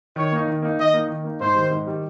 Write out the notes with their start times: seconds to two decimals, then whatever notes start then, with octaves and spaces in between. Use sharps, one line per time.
0.16 D#3 C#5
0.32 A#3 D#4
0.47 D#3
0.62 A#3 D#4
0.78 D#3 D#5
0.94 A#3 D#4
1.08 D#3
1.24 A#3 D#4
1.40 G#2 C5
1.55 D#3 G3
1.71 G#2
1.86 D#3 G3